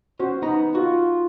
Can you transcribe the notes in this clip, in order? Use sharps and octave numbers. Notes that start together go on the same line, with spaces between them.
C#4 F#4 C5
B3 D#4 A#5
F4 F#4